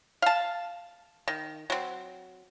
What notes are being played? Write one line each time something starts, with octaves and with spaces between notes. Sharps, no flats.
F5 A5
D#3
F#3 C4